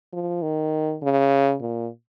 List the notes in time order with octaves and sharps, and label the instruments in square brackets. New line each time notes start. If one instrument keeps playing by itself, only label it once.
[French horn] F3
D#3
C#3
A#2